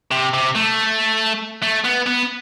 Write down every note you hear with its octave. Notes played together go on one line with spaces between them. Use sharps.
C3
C3
A3
A3
B3
B3